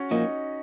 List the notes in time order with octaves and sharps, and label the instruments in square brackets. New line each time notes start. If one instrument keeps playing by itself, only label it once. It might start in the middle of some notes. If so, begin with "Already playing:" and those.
Already playing: [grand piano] C#4 F#4 C#5
[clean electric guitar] A#2 F3 A#3 [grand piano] D#4 D#5